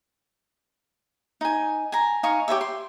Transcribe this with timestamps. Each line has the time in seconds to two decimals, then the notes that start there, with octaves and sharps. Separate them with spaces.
1.41 D#4 G#5
1.92 G#5 A#5
2.23 D#4 F5 G#5 C#6
2.48 G4 C5 C#5 E5
2.61 C6